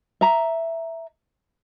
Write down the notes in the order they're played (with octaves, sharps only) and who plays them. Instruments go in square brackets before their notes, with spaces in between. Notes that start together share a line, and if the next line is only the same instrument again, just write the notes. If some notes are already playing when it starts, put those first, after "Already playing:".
[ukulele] E5 A#5